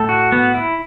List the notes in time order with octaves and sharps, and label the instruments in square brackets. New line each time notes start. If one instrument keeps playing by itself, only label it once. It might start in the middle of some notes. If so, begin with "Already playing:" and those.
Already playing: [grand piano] A2 A3 [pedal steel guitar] A4
[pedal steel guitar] F#4
B3
E4